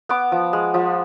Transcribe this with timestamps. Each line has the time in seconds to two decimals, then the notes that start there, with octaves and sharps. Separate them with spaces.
0.09 B3 D6
0.32 F3
0.53 G#3
0.74 F3